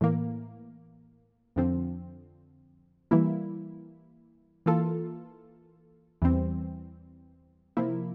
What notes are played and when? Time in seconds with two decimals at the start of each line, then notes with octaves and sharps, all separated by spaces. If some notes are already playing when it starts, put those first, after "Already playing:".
0.01 A2 E3 A#3
1.56 F2 D3 F3 C4
3.11 E3 G3 A#3 E4
4.66 E3 A#3 F4 A4
6.22 E2 E3 G3 C4
7.77 C3 F3 A#3 E4